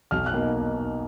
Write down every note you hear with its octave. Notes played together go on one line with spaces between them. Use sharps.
B1 F6
F#6
B2 A#3 D#4